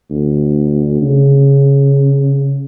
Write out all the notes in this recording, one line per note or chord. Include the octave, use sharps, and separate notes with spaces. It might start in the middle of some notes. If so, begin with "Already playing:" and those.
D2
C#3